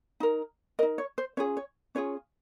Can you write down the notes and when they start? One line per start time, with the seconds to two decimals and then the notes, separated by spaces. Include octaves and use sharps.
0.20 D#4 A#4
0.79 A#4 D#5
0.83 D#4
0.98 C#5
1.18 C5
1.37 C#4 F4 G#4 C#5
1.57 C#5
1.95 C#4 F4 G#4 C#5